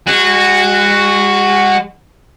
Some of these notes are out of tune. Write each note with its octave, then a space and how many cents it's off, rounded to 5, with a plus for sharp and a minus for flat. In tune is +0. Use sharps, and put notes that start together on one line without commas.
G#3 -40 F#4 +0